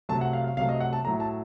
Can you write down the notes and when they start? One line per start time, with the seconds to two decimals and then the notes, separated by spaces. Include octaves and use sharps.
0.09 C3 F#3 A3 A5
0.21 F#5
0.33 F5
0.44 F5
0.57 C3 F#3 A3 F5
0.69 D#5
0.80 F#5
0.93 A5
1.05 A2 F#3 A3 A#5
1.20 A5